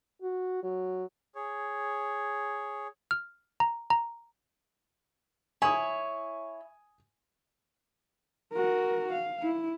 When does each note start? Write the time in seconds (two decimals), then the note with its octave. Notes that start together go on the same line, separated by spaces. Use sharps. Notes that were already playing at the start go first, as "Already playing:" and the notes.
0.22 F#4
0.63 F#3
1.35 G#4 C#5
3.11 F6
3.60 A#5
3.90 A#5
5.62 E4 C#5 G#5 D#6
8.53 F#4 A#4
9.12 F5
9.42 E4